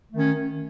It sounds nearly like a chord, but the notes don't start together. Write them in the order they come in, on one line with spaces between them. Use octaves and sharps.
A3 D#3 C#4